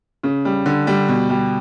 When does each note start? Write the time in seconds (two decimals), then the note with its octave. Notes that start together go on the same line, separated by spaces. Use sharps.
0.23 C#3
0.45 G3
0.66 D3
0.87 G3
1.08 B2
1.30 G3